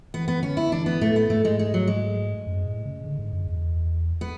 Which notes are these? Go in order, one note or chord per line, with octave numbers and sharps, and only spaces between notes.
E3 B3
B3
D3 C#4
E4
E3 D4
B3
A2 A3
B3
G#2 A3
G#3
G#3
F#3
G#3
F#2
A2
C#3
D3
G#2
F#2
E2
B3